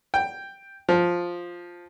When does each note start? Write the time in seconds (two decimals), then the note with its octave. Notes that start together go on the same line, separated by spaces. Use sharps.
0.14 G5
0.89 F3